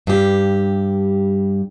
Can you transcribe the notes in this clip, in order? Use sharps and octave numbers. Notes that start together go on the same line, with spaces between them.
G2 G4